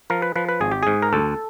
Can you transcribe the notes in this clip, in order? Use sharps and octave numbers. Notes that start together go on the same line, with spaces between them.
F3 A#4
B4
F3 B4
B4
G#1 G#4
G4
G#2 G#4
A#4
D2 A4